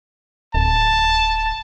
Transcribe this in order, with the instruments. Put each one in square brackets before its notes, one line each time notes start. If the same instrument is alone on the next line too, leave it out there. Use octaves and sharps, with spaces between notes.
[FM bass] D1 [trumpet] A5